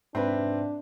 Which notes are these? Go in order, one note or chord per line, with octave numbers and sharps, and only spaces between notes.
F2 G#2 C3 C4 D4 B4 E5